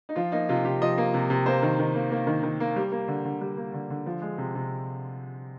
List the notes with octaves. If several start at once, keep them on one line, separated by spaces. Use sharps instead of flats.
D#4
F3 F4
A#3 D#4
C3 F4
C3 G4
F3 D#5
A#3
C3
C3
A#3 C5
D#3
D#3
A#3
A#3
D#3
D#3
A#3
G3
A#3
D3
D3
G3
A#3
D3
D3
F3
G#3
C3
C3